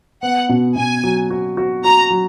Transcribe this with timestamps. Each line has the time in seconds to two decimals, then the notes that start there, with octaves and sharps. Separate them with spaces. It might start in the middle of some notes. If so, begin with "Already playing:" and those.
0.22 B3 F#5
0.49 B2
0.76 B2 G#5
1.04 F#3
1.31 F#4
1.57 F#4
1.84 F#4 A#5
2.10 F#3